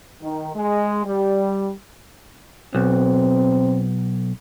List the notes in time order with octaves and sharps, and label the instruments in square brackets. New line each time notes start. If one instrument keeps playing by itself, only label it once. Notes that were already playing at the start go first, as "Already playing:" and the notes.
[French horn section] D#3
G#3
G3
[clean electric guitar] B1 [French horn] C4